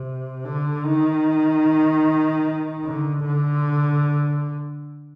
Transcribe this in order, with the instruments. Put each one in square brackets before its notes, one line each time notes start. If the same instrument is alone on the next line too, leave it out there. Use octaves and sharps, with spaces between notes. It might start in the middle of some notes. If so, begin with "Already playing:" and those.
Already playing: [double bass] C3
D3
D#3
D3
D3